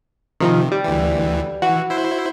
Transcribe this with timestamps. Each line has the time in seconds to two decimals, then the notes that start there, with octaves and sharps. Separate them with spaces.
0.40 C3 D#3 F3 D#4
0.72 G3
0.84 D2 E3
1.62 E3 F#4
1.90 E4 C5